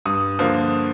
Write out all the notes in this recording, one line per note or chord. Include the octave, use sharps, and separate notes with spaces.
G2 D#6
D3 F3 A#3